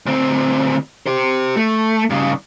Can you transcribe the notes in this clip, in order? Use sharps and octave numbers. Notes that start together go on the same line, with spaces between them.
D2 C4
G4 C5
A3
G2 C#3